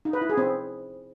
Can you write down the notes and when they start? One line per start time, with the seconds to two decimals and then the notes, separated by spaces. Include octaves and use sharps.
0.05 D#4
0.13 B4
0.21 E4
0.29 G#4
0.38 C4